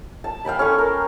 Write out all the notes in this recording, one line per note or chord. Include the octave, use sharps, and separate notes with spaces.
A5
F5 G5 G#5 B5
C#4 A4 C#6
A#4